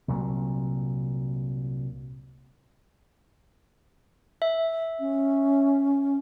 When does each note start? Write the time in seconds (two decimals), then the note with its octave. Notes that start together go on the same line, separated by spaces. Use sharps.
0.08 C2 A#2 F#3
4.42 E5
5.00 C#4